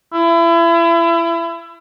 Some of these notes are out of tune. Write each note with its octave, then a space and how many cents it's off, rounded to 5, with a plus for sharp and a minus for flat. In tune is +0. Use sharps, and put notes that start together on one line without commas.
E4 +30